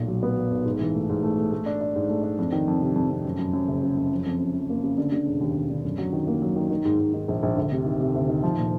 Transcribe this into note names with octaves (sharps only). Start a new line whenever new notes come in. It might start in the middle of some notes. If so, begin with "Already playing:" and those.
Already playing: B1 A#2
F#3
B3
F#3
B1
G#2
E3
A3
G#2
A3
A3
A3
D4
D4
G#2
A3
D4
F2
D#3
F2
C3
F2
F2
F#2
F#2
F#2
F#1
C#3
F#2
F3
F2
C#3
F2
A#3
C#3
D3
D3
E1
D#2
E1
D3
F#2
F#3
D#3
A#3
F#3
D#3
D#3
G#2
G#2
D#3
A#1
A#1
D2
C3
D#3
C3
D2
D#3
F3
A#2